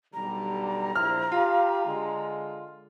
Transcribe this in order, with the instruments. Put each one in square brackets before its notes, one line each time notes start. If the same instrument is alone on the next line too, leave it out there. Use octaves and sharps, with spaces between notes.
[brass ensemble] B1 D3 G3 [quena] A#5
[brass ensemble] A#1 E4 C5 [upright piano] F6
[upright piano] F4 [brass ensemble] G4 F5
[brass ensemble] D3 G#3